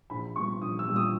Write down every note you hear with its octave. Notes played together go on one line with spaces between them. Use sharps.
A#1 B5
A#2 G3 B3 C#6
A#1 D#6
E6
A#2 G3 B3
D#6